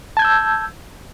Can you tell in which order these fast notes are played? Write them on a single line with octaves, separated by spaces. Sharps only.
A5 G#6 G6 E6